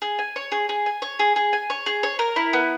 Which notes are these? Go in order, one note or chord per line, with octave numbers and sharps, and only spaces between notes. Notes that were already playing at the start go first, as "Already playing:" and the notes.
G#4
G#5
C#5
G#4
G#4
G#5
C#5
G#4
G#4
G#5
C#5
G#4
C#5
A#4
E4
B3